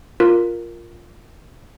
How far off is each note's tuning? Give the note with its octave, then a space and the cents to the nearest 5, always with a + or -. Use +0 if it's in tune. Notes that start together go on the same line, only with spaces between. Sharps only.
F4 +0 A#4 +0